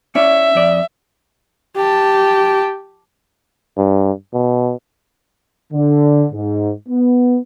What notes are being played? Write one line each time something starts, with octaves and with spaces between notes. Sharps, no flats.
C#4 E4 D5 E5
F2 D5
G4 A5
G2
B2
D3
G#2
B3